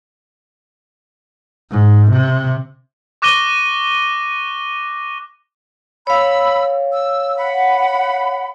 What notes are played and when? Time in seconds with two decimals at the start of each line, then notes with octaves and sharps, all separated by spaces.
1.72 G#2
2.11 C3
3.22 C#6 D6 F#6 A#6 D#7 G7
6.07 C#5 F5 B5 E6
6.92 E6
7.37 F#5 B5